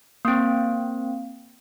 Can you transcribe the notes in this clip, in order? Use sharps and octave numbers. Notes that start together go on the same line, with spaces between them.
A#3 C4